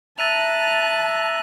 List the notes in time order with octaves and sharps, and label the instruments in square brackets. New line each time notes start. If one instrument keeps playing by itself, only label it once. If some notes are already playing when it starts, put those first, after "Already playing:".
[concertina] E5 A#5 [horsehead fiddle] A5 [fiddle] F#6 [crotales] A6 D#7 F7